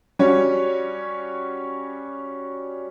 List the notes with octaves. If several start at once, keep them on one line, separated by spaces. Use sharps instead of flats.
G3 C#4 F#4 C#5